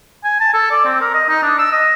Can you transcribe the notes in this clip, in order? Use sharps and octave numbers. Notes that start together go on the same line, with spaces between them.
G#5
A5
A4
D5
C4
A#4
D#5
D#4
D4
E6
D#5